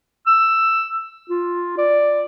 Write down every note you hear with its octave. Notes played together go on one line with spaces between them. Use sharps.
E6
F4
D5